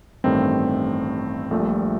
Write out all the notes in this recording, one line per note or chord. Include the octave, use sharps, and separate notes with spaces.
A1 G2 D#3 A3 C4
A#1 A#2 A3
G3
A3